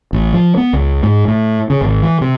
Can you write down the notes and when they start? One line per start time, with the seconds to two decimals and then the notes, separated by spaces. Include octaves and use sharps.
0.13 A1
0.33 F3
0.57 B3
0.73 C#2
1.03 G#2
1.28 A2
1.70 C#3
1.81 G#1
2.02 E3
2.21 C3